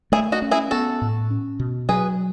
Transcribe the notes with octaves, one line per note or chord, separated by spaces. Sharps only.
A3 E4 G#4
D#4 F#4
C#4
E4 G#4
B3 F#4 A4
A2
C#4
B2
F#3 G#4 B4